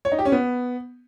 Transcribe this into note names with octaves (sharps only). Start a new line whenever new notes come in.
C#5
D#4
G4
C#4
B3